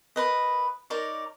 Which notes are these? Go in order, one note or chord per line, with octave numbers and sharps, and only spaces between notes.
A#4 B4 D#5
D#4 A#4 C#5 D5